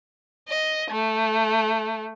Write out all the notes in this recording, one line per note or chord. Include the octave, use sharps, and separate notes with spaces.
D#5
A3